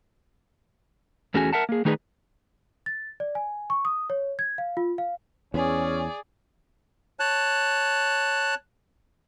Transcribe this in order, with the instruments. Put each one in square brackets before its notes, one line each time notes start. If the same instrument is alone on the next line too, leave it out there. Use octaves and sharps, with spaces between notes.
[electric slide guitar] E2 A3 C#4 F#4 G#4 G#5
A#4 E5 F#5 A5
A#3 G#4
D#3 A3 D#4 G#4 B4 D5
[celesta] A6
D5
G#5
C#6
D#6
C#5
G#6
F5
F4
F5
[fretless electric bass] E2 [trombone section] C#4 [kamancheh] G#4 D5
[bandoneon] C#5 A5 F#6